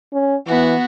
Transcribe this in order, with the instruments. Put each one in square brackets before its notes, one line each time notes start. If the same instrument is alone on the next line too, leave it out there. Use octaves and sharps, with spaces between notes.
[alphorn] C#4
[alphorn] E3 [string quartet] B3 F#4 F#5